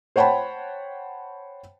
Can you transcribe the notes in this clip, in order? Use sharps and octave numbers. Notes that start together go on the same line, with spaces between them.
C5 C#5 F#5 G5 A5 B5